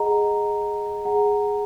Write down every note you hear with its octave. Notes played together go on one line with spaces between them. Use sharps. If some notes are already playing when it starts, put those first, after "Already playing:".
Already playing: G#4 D#5 F#5 A#5
G#4 F#5 A#5